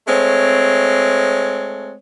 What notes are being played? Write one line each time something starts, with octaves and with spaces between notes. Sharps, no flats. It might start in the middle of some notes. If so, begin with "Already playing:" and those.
G#3 A3 C4 C#5